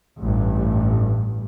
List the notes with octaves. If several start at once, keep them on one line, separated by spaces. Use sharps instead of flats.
A1 G2